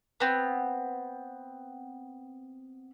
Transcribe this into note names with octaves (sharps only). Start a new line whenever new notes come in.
B3 C4